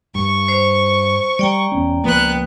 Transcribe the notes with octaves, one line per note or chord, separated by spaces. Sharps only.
G2 C#6
C5
G3 D5 G5 A#5
E1 B3 C#4
C#2 F3 A#3 B3 F#6